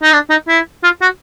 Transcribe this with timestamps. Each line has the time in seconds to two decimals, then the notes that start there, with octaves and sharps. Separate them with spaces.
0.03 D#4
0.13 D4
0.30 D#4
0.48 E4
0.83 F4
1.02 F#4